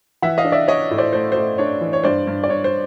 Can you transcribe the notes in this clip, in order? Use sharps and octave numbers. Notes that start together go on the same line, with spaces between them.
E3 E5 F#5
D#5 F5
D4
D5 E5
D4 C#5 D#5
A2
C5 D5
A3 C5
A3 C5
D4 C#5
E3
C#5
G2 C5 D5
G2
D5
G2 C#5
C5